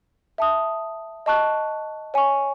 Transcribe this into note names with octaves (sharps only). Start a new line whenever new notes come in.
E5 A5 D#6
D#5 A5 C#6 F#6
C#5 G#5 C#6